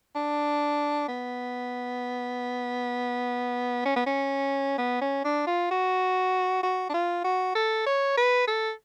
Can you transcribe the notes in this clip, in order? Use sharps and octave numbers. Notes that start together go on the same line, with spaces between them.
D4
B3
C#4
B3
C#4
B3
C#4
D4
F4
F#4
F#4
D4
F4
F#4
A4
C#5
B4
A4